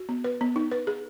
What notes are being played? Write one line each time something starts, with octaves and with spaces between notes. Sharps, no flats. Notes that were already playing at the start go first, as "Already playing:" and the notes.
Already playing: F#4
B3
B4
B3
D#4
B4
G#4